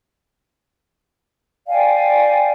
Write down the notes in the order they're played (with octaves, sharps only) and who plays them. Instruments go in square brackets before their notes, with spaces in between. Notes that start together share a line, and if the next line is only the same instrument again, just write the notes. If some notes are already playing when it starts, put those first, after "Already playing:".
[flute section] D5 F5 G5 G#5